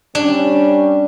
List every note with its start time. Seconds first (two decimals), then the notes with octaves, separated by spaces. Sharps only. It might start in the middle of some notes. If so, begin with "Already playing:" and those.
0.15 G3 C#4 D4